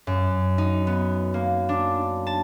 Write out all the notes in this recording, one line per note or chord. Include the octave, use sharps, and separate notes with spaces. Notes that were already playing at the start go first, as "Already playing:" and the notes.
F#2
D#4
B3
A#3
D4
A5